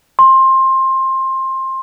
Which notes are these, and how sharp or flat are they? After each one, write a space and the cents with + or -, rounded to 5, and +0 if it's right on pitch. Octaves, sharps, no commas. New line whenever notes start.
C6 +20